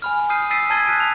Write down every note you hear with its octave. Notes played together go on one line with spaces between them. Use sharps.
G#5 B5 F6
D#6 F6 G6 C7 D#7
E6 A6 B6 C7 D7 D#7
A5 E6 G#6 A6 D#7 G7
F6 F#6 A6 B6 D7 D#7
F7